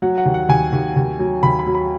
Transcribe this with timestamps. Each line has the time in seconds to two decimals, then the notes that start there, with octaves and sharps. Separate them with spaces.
0.02 F#3 F#5
0.18 F#5
0.26 D#2
0.34 F#5
0.49 D#2 G#5
0.73 D#2
0.96 D#2
1.19 F#3
1.43 D#2 B5
1.59 B5
1.67 F#3
1.75 B5